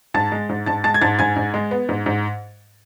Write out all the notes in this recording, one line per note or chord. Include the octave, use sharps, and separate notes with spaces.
G#2 A5 A6
G#3
G#2
G#2 A5 A6
G#3 A5 A6
G#6
G#2 A5 A6
G#2 G#5 G#6
G#2
G#3
B3
G#2
G#2